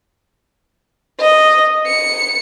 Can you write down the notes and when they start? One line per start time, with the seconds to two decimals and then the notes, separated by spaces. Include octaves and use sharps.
1.21 D#5
1.86 C#7